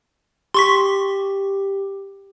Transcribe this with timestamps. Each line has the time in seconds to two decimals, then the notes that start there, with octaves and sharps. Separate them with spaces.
0.54 G4 C6 C#6 B6